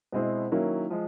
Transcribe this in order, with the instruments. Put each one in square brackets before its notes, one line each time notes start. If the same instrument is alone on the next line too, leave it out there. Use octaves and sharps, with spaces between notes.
[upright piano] B2 G#3 C4 E4
D#3 F#3 A#3 C#4 E4
F3 G#3